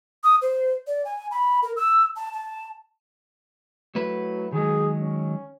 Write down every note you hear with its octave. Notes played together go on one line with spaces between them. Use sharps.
D#6
C5
D5
G#5
B5
A#4
E6
A5
A5
F#3 A3 E4 B4
D#3 F#3 G#3 G#4
C#4